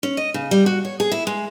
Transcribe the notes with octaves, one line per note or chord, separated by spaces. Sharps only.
C#4
D#5
C#3
G3
F#4
C#5
G#4
E4
G#3